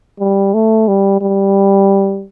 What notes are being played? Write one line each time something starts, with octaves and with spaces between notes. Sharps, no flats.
G3
A3
G3
G3